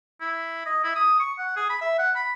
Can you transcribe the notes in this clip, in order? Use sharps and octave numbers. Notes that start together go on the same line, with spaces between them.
E4
D#5
E4
D#6
C#6
F#5
G#4
B5
E5
F#5
B5